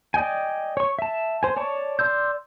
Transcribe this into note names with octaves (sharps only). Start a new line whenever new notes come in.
D5 D#5 G5 G#5
C#5 C#6
E5 A5
C5 G#5
C#5 D5 A5 C#6
D5 C6 E6 G6